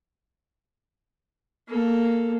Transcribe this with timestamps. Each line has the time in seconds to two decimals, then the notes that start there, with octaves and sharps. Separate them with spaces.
1.68 A#3 A4